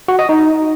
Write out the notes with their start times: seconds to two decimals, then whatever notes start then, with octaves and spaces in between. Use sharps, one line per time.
0.08 F#4
0.19 D#5
0.29 D#4